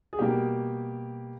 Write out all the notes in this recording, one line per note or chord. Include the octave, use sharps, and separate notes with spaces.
G#4
B2 G3 A#3 G4